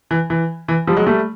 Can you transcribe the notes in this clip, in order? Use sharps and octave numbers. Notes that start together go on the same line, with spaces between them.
E3
E3
E3
F3 G3
F#3 G#3
G3 A3